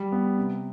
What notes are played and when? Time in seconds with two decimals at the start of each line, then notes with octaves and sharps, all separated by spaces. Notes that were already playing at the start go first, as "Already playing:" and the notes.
Already playing: G3
0.12 B3
0.38 C3